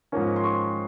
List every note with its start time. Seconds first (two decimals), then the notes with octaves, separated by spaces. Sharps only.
0.12 G#2 F3 A#3 C#4
0.36 C6
0.44 C#6